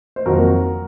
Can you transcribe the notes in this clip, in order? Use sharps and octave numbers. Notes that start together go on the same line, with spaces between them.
C5
F2 D#3 F#3 A#3 F#4 A#4